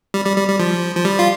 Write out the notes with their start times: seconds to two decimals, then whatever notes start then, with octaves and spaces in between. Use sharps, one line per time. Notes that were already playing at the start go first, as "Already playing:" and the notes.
0.14 G3
0.25 G3
0.37 G3
0.48 G3
0.60 F3
0.97 F3
1.05 G3
1.19 F4